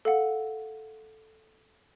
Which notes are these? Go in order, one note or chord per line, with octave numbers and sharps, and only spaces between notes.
A4 F5 F#5